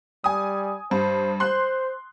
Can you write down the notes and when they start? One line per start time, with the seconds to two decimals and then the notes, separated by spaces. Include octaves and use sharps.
0.24 G3 G#5 D#6
0.91 G2 C5
1.40 C5 C6 F#6